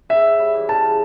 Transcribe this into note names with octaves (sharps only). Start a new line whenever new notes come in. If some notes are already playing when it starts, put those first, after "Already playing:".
C#3 E5
C#3
G3
E3
C#3 A5
C#3